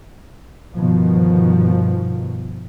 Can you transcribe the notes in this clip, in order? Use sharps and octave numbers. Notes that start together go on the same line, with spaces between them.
G1 B2 D#3 F3